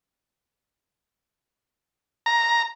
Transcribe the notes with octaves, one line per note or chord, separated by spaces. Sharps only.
A#5